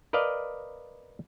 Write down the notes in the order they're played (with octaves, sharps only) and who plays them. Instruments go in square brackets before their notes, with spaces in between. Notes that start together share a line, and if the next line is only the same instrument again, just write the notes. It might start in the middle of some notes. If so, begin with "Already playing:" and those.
[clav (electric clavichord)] A#4 B4 D5 D#5 F5